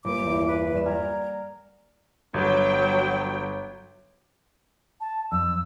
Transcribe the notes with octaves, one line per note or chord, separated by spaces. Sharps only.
G1 A#3 B4 D6
E2
B4
G1 D5 E7
F#5 G#5 A#5 F6
G1 F#3 G5
A5
F2 E6